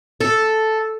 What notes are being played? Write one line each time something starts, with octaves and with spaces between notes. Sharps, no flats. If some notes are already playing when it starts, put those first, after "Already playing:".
A4